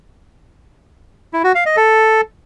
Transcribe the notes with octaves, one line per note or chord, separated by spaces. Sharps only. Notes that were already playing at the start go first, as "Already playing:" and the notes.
E4
F#4
F5
D#5
A4